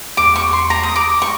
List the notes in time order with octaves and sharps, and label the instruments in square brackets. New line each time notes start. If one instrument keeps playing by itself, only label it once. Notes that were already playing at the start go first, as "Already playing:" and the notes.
[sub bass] E2 [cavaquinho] D6
[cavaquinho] C#6
C6
A#5
D#6
D6
C#6